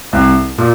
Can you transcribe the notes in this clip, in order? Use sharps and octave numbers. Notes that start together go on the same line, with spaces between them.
C2
A#2